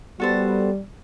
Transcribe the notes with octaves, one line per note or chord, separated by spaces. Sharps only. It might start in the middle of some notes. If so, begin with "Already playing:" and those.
G3 B3 F#4 A4 C5